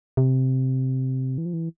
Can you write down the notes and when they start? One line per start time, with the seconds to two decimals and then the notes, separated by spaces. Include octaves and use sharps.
0.17 C3
1.38 E3
1.45 F3
1.53 E3